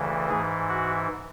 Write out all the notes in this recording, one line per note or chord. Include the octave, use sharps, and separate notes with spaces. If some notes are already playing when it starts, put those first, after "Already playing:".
Already playing: D2 C#3 E3
G#2 E3 G#4
F#4